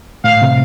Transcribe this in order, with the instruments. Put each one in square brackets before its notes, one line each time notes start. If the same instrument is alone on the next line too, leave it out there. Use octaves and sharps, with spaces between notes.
[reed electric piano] A2 [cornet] F5
[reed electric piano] C3